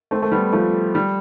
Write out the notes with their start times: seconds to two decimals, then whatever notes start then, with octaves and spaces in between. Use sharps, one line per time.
0.11 A3 C4
0.22 A3
0.32 G3 B3
0.53 F3 A3
0.95 G3